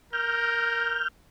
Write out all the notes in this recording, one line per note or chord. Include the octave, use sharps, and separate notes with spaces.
A#4 F6 G6